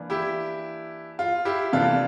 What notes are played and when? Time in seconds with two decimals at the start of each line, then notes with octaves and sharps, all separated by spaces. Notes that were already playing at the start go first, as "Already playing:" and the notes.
Already playing: E3 A#3 D4
0.10 E4 G4
1.19 F4
1.45 E4 G4
1.72 C3 E3 A#3 D4 F4 A4